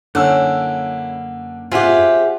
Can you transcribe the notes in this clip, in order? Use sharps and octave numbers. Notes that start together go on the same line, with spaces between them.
F#2 D3 A#3 C#4 E4 E6
C4 F4 G4 G#4 E5 F#5